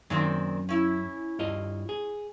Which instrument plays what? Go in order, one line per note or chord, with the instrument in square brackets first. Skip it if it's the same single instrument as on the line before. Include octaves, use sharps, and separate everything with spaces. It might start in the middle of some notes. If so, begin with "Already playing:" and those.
[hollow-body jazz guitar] F#2 [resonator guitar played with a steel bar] A#2 D#3 C4
[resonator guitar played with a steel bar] C#4 E4
[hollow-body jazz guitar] G2 F4 D#5
G#4